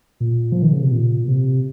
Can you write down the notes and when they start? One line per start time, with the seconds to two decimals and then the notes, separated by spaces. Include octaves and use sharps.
0.20 A#2
0.52 F3
0.62 D#3
0.72 C#3
0.82 C3
0.92 A#2
1.28 C3